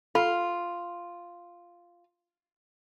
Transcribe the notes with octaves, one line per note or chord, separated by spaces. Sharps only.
F4 A4 B5